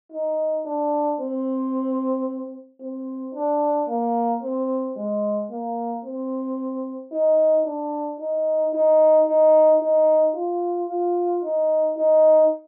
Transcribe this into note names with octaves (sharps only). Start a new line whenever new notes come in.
D#4
D4
C4
C4
D4
A#3
C4
G#3
A#3
C4
D#4
D4
D#4
D#4
D#4
D#4
F4
F4
D#4
D#4